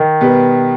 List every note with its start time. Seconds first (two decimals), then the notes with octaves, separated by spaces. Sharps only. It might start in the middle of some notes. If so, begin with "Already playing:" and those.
Already playing: D#3
0.21 B2 G3 B3